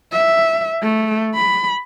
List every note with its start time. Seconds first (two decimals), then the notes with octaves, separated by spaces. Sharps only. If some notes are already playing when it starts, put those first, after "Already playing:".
0.12 E5
0.82 A3
1.34 B5